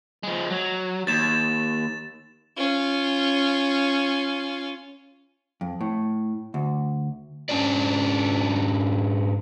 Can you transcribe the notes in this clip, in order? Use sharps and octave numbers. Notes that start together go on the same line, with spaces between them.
F3 G#3
F#3
D#2 A6 E7
C#4 F4
F2
A2
D2
G#2 G#3 C#4 D4 D5